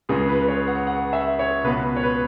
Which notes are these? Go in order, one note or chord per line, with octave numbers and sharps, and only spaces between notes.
C#2 C#3 G#3 C#4 G#4
B4
B4
C#5
F#5
F#5
E5
C#5
C#2 B2 B3 B4
C#5
B4